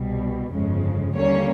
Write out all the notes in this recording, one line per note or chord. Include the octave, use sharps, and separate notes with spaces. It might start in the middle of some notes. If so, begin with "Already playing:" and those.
Already playing: C2 B2 G3
G1 F2 C#3 F3 G#3
D#2 D3 G3 A#3 C#4 C#5